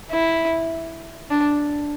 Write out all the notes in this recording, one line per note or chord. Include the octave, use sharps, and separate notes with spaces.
E4
D4